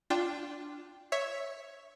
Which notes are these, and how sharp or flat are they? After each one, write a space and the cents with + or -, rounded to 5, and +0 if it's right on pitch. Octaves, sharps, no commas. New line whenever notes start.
D4 +0 F4 +0 G5 +0
C#5 +0 E5 +0